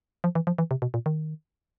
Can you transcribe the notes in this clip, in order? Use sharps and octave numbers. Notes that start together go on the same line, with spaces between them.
F3
E3
F3
E3
C3
B2
A#2
D#3